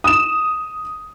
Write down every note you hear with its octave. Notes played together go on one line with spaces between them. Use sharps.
D#6 E7